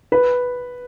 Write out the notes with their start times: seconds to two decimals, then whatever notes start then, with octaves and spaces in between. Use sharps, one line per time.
0.12 B4